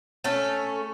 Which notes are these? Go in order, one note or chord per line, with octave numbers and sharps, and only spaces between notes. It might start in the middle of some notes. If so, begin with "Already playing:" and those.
A3 C#4 A4